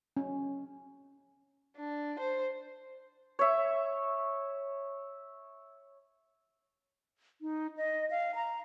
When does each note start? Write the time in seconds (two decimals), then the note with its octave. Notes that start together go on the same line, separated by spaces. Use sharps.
0.17 C#4
1.77 D4
2.19 C5
3.39 C#5 E5
7.42 D#4
7.77 D#5
8.10 F5
8.35 A#5